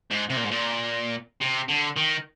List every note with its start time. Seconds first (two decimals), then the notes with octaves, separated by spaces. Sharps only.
0.11 G#2
0.30 C3
0.37 A#2
0.44 G#2
0.51 A#2
1.41 C3
1.69 D3
1.97 D#3